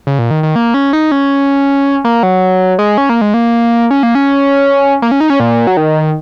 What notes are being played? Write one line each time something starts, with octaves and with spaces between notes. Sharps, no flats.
C#3
A#2
D#3
D#3
A#3
C#4
D#4
C#4
A#3
F#3
G#3
C#4
A#3
G#3
A#3
C#4
A#3
C#4
A#3
C#4
D#4
C#4
A#2
F#3
D#3